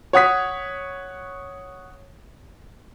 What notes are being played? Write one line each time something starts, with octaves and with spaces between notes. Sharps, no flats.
C#5 F#5 D#6 B6